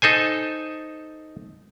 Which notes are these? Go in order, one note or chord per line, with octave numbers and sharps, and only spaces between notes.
D#4 A4 C5 G#5